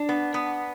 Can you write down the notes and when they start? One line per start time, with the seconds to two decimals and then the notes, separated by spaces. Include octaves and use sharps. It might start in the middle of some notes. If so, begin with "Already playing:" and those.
Already playing: D4
0.09 B3
0.34 B3